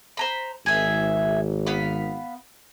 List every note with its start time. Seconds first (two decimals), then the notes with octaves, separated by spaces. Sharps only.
0.17 C5 A#5 B5
0.66 G#1 G#4 E5
1.67 B3 F5 B5